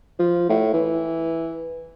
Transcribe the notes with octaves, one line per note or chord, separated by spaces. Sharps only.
F3
A2
E3